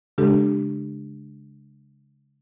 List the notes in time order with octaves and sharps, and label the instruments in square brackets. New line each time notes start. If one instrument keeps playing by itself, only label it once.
[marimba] C#3 G#3 D4 G4 A4